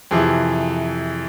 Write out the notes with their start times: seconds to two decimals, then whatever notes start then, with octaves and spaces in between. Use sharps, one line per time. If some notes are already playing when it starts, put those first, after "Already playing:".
0.11 F2 C3 E3 G#4